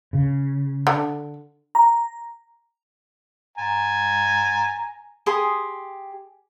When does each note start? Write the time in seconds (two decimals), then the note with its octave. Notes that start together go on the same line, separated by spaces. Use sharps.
0.13 C#3
0.87 D3
1.75 A#5
3.58 G#5 A#5
5.26 G4 G#4 C6 D#6